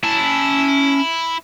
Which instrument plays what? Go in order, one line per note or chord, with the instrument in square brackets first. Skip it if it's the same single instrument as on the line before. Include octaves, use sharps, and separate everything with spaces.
[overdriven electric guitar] C#4 A5 [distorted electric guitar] E4